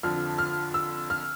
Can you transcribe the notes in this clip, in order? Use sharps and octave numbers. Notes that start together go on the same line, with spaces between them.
F2 D3 F3 F6
F6
E6
F6